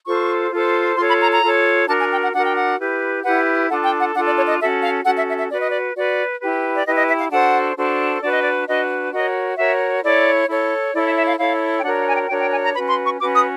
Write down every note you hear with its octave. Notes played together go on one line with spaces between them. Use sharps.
F4 A4 C5 C#6
F4 A4 C5
F4 A4 C#5 C6
B5
A#5
A#5
F4 A4 C#5
D4 F#4 A#4 A5
G#5
G5
F#5
D4 F#4 A#4 F#5
G5
F#5
E4 G4 B4
E4 G4 B4 F#5
D4 F4 A4 F#5
G5
F#5
D4 F4 A4 F#5
D5
C#5
D#5
C#4 F#4 A4 E5
F5
C#4 F#4 A4 F#5
E5
E5
E5
F#4 B4 D5
D#5
D5
F#4 B4 D5
E4 G4 B4
D5
E4 G4 B4 D#5
D#5
E5
F5
D4 F#4 A4 C5 F#5
D4 F#4 A4 C5
D4 F#4 B4 D5
D#5
D5
D4 F#4 B4 D#5
F#4 A#4 C#5 D#5
F#4 A#4 C#5 E5
E4 A4 C#5 D5
E4 A4 C#5
E4 A4 C#5 D5
E5
E5
F5
E4 A4 C#5 F5
G5
D4 F#4 A#4 C#5 F#5
F#5
G#5
G5
D4 F#4 A#4 C#5 G5
G5
G#5
A#5
C#4 F#4 B4 B5
C6
C#6
C#4 F#4 B4 D6
D#6